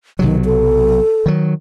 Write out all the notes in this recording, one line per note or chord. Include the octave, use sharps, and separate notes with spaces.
B1 C3 D#3 F#3
A4
D#3 F#3